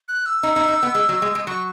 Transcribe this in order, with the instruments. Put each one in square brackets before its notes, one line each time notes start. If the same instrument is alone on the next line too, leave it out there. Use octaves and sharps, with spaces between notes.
[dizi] F#6
E6
[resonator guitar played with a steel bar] D#4
D#4
D#4
B3
G#3
F#3
G#3
G#3
[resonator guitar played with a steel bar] F#3 [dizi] C#6